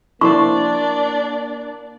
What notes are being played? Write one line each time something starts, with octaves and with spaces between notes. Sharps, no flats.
A#3 D4 E4 C5 D5 C#6